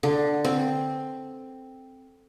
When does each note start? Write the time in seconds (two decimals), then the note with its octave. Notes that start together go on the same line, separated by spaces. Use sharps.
0.03 D3
0.45 C4